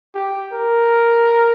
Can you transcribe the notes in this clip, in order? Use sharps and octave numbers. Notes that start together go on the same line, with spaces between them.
G4
A#4